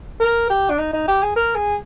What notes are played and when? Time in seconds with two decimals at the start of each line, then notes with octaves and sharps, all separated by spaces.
0.20 A#4
0.50 G4
0.70 D4
0.79 D#4
0.93 D#4
1.08 G4
1.23 G#4
1.36 A#4
1.55 G#4